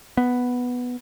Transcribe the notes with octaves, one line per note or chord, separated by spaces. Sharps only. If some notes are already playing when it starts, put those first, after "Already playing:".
B3